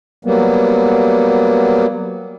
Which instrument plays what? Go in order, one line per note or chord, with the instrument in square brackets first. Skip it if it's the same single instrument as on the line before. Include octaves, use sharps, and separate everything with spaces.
[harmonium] F#3 G3 A#3 B3